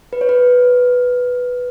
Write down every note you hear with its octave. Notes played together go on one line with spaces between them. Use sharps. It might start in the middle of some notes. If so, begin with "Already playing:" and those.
B4
C#5
B4